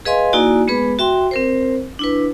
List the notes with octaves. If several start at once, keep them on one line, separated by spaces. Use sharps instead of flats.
G#4 B4 D#5 F5 G#5 C6
A#3 D#4 E4 F#4 D5 G#5
G#3 B3 G#4 B4 B5
F#4 E5 G5 C6
C4 A#4 C5
D4 E4 B4